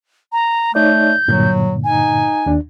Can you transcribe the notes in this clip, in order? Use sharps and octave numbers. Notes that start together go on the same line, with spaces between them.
A#5
A3 D#4 C#5 D5 G6
G2 A#2 D3 F#3
D#4 G#5
D#2 D4